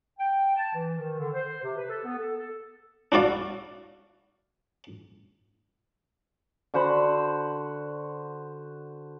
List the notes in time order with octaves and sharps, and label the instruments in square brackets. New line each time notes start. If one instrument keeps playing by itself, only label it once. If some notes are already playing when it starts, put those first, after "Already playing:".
[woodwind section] G5
A5
E3
D#3
D3
C5
C3
B4
A4
B3
A4
A4
[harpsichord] D4 E4 F#4 D5 F5
[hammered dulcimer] D3 F#4 C5 B5